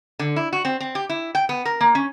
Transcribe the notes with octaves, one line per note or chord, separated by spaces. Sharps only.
D3
E4
F#4
C4
C4
G4
E4
G5
B3
A#4
A#3
C#4